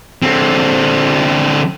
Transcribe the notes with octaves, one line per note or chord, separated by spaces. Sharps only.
D3 C4